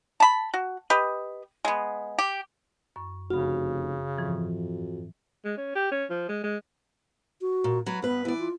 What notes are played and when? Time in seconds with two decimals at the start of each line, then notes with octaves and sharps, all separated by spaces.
0.20 A5 B5
0.54 F#4
0.90 G4 B4 D#5
1.65 G#3 B3
2.18 G4
2.96 F#2 C#6
3.30 F1 C#3 F#4 B5 F6
4.17 F2 G#2 E3 F3
5.45 G#3
5.57 C#4
5.76 G4
5.91 C#4
6.10 F3
6.29 G#3
6.43 G#3
7.41 F#4
7.64 A#2
7.86 F#3 F#4 B4
8.02 G2 B3 B4
8.25 E3 B3 D5
8.39 F4